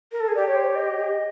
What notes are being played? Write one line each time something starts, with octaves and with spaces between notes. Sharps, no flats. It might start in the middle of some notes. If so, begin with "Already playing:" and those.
A#4
A4
G#4
G4 D5
C#5
C5
C#5
D#5